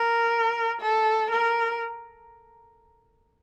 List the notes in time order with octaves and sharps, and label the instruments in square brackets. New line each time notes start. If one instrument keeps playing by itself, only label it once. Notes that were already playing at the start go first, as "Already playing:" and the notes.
Already playing: [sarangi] A#4
A4
A#4